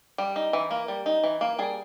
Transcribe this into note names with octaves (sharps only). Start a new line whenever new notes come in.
G3
D#4
E3
A#3
G3
D#4
E3
A#3
G3 G#4